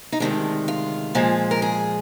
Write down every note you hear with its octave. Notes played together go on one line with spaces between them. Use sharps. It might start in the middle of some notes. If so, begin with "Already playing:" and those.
D#4
D2 C3 D#3 G#3 D4
F4
A#2 F3 G#3
A#4
G#4